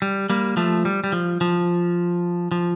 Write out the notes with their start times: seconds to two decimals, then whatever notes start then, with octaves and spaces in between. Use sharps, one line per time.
0.02 G3
0.30 G3 A#3
0.57 F3 A3
0.85 G3
1.04 G3
1.12 F3
1.41 F3
2.51 F3